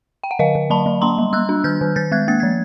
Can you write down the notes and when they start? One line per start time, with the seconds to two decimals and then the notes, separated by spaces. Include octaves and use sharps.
0.24 G5
0.31 F#5
0.39 D3 D#5 F5
0.55 D3
0.70 F#3 A5 B5
0.86 F#3
1.01 A#3 A#5 C6
1.18 G3
1.33 G3 E6 F#6
1.49 D4
1.64 D#3 F6 G6
1.81 D#3
1.96 D#3 G6 A6
2.12 G#3 F#6 G#6
2.28 A#3 A6
2.40 F3 G#6